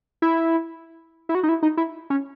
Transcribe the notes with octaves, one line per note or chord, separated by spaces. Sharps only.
E4
E4
F#4
D#4
E4
D#4
E4
C#4